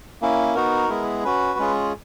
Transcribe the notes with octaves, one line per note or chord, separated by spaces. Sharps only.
A#3 C#4 E4
B3 D#4 F#4 A#4
G#3 B3 E4 G#4
C#4 F#4 B4
G#3 C#4 F4 G#4